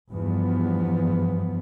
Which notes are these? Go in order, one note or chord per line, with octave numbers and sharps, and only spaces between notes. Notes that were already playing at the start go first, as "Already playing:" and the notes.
E2 G2 F3 B3